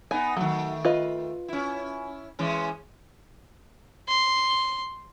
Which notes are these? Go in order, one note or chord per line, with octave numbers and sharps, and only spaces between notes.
B3 D#4 G#5
D#3 F#3 A3
F4 B4 D#5
C#4 E4
E3 G#3 C#4
C6